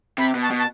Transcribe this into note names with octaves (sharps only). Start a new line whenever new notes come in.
C3 B5
B2
A5
B2
A5